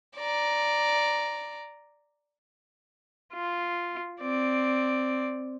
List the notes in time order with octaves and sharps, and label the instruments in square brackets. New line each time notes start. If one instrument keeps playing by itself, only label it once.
[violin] D5 A#5
[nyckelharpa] F4
C4 D5